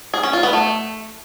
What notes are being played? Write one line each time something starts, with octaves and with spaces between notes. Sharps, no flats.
G#4
C#4
F4
B3
A3